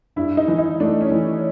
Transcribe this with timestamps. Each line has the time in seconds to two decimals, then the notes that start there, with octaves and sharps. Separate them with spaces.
0.16 G2 E4
0.37 D#4
0.48 E3
0.58 D#4
0.80 A3 D4
1.01 C#4
1.11 E3